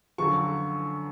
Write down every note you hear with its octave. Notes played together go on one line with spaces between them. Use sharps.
F#2 D3 F3 C#6